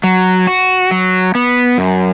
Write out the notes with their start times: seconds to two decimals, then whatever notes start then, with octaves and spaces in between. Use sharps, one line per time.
0.04 F#3
0.47 F#4
0.91 F#3
1.35 B3
1.78 F#2